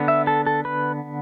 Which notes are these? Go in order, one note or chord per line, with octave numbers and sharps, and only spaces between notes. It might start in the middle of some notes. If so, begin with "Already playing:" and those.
Already playing: D3 B3
E5
A4
A4
B4